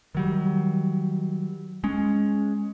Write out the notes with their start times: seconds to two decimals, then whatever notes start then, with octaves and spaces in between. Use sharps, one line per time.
0.15 D#3 F#3 G3
1.84 G#3 C#4